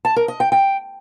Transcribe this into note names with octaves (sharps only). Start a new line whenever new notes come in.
A5
A#4
D#5
G5
G5